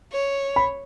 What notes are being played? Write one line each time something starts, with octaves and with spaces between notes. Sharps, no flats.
C#5
B5